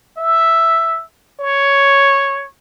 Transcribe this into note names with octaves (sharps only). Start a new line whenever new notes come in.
E5
C#5